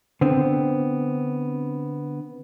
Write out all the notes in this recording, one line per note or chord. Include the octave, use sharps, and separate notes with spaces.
D3 B3 C4